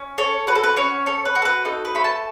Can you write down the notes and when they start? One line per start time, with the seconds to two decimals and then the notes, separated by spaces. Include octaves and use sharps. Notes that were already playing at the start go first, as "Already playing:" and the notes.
Already playing: C#4
0.18 A4 C#5
0.47 F#4 B4
0.55 A4
0.63 B4
0.76 C#4 C#5
1.06 A4 C#5
1.25 B4
1.35 F#4
1.42 A4
1.45 B4
1.65 D#4 A4
1.85 B4
1.95 A3 B5
2.04 A5